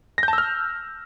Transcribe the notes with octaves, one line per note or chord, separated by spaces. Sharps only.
A#6
G6
A5
E6
F6